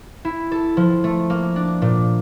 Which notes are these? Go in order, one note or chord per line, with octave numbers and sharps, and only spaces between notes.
E4
A4
F3
A3
A#3
D4
A#2